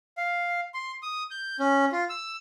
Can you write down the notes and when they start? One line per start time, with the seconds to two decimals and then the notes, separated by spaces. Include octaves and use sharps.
0.17 F5
0.74 C6
1.03 D#6
1.31 G6
1.60 C#4
1.92 F4
2.10 E6